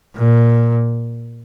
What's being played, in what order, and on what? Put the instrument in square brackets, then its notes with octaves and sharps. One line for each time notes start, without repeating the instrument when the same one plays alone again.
[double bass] A#2